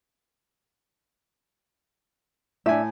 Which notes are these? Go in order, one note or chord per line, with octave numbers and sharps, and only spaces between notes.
A2 D4 E5 G#5